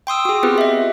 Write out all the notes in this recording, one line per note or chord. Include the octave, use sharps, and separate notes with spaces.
G5 C6 D#6 E6
F#4 G#4
B3 C4 F4 G4 B4
D#5 E5